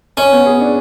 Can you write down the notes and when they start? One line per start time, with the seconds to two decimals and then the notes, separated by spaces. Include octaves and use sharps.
0.17 C#4 C#5
0.32 B3
0.46 G#4
0.61 D4